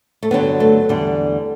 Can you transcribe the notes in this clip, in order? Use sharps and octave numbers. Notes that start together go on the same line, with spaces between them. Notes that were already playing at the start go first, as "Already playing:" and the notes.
A3
G2 D3 F#3 B3
A3
E2 D3 G3